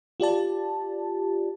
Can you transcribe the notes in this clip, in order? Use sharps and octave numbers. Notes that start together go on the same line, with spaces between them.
F4 G4 D5 A5